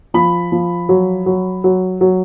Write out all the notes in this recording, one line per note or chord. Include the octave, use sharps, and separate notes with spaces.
F3 B5
F3
F#3
F#3
F#3
F#3